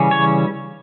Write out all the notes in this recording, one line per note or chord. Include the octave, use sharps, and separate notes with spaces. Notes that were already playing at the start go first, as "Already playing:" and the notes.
Already playing: C#3 E3 G3 C#4
C#5